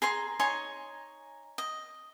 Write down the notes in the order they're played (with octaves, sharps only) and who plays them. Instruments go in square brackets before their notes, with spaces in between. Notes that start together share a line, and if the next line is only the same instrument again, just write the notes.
[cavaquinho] G#4 A#5 C6
D#4 C#5 G#5 C6
D#5